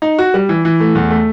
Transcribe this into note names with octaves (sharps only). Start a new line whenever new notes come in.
D#4
F#4
G3
E3
E3
A3
E2
A3